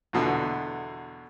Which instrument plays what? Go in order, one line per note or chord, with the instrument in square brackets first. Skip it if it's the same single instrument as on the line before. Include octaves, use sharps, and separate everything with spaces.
[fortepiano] E2 B2 D3